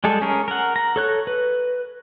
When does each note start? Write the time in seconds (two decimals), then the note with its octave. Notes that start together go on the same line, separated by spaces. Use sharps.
0.04 G3 G#3 G#4 A4
0.22 C#4 G#4 A#4
0.48 A#4 F#5
0.76 A#5
0.96 A4 C#5 F#6
1.27 B4